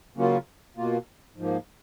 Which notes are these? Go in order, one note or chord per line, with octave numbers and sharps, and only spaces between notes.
C#3 F#3 A#3 C#4 F4
B2 A#3 F4
G#2 F3 A#3